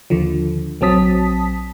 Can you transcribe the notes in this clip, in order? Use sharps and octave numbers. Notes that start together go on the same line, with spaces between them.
D#2 D3 F3
A#1 F#3 C4 A5 D#6 B6